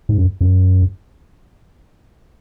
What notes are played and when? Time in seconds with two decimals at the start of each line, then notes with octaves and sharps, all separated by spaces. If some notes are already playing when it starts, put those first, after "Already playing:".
0.09 G#2
0.17 F#2
0.41 F#2